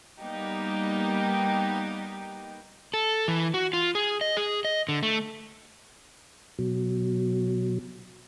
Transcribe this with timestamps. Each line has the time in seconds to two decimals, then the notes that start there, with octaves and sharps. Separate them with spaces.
0.21 G3 A#3 B3 D#4 G4
2.94 A4
3.28 E3
3.54 F#4
3.73 F4
3.95 G#4
4.21 D#5
4.37 G#4
4.65 D#5
4.89 D3
5.03 A3
6.59 B2 F#3